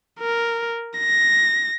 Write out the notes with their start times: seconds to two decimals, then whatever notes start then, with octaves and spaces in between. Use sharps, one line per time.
0.20 A#4
0.99 A#6